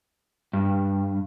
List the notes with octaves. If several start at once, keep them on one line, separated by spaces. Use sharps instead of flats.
G2